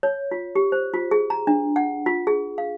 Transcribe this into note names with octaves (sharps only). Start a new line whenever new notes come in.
C#5
F4
G4
C5
F4
G#4
A#5
D4
F#5
F4
G#4
F5